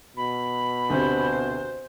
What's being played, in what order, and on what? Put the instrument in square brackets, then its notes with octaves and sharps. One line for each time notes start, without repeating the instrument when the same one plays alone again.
[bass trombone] B2 [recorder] B5
[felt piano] D2 C3 [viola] C5